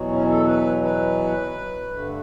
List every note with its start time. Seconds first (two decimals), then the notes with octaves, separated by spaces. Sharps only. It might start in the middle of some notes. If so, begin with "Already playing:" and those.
Already playing: E2 B2 F#3
0.11 C#4
0.29 A4
0.47 B4
0.83 B4
1.90 G2 D3 A3